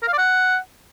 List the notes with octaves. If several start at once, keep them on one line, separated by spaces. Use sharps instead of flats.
A#4
F5
D5
F#5